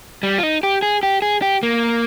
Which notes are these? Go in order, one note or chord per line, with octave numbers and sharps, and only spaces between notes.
G3
F4
D#4
G4
G#4
G4
G#4
G4
A#3